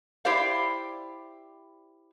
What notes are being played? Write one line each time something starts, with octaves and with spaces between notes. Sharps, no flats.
E4 G4 C5 D5 F5